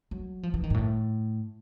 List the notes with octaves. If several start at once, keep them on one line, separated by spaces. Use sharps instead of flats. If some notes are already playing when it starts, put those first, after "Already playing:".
F#3
F3
E3
D#3
G#2
A2